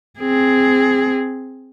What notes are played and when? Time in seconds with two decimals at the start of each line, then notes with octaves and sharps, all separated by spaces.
0.19 C4 G#4